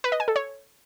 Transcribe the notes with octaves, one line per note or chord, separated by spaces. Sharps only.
B4
D#5
G#5
A4
C#5